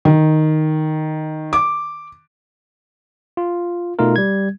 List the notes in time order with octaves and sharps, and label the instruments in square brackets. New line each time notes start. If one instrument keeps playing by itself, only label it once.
[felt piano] D#3
D6
[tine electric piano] F4
B2 A3 D#4 F4 A#4
G3 G#6